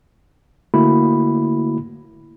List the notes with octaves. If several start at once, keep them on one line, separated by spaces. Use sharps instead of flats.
D3 A3 A#3 E4 F#4 B5